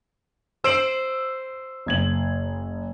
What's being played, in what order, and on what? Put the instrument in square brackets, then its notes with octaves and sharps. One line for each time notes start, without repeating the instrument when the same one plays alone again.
[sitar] C5 [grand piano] E6 D7 F#7
[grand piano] F#1 G#6 F#7